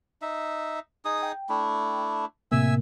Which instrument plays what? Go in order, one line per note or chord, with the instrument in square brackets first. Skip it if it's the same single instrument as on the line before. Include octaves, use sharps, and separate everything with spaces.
[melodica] D#4 E5
D#4 G#4 D#6
[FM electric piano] G5
[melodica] A3 D4 E4
[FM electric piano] A2 C3 A#3 [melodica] E5 G#5 E6